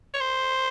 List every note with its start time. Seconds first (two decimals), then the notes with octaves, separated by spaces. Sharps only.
0.14 C#5
0.20 C5